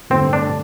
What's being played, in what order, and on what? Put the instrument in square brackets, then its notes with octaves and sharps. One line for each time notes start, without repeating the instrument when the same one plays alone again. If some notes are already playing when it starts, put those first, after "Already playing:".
[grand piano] G2 D3 A3 [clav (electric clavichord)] C4
[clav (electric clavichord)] D4